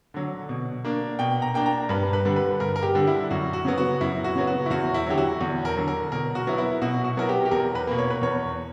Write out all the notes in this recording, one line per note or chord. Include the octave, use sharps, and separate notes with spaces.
D3 F#3
B2
A#3 D4
B2 G5
A#5
A#3 D4 G5
A#5
G2 B4
B4
D3 G3
B4
G2 A#4
A#4
G4
D3 G3
E4
F#2 F#4
F#4
C#3 F#3 B3
F#4
F#2 E4
F#4
C#3 F#3 B3
F#4
E4
E2 F#4
E4
D3 F#3 G4
F#4
E2
A#4
D3 F#3
A#4
B2 A#4
F#4
F#3 B3 E4
E4
B2 F#4
F#4
F#3 B3 E4 A#4
G4
G4
E2 A#4
B4
B2 A#3
C#5
B4
E2 C#5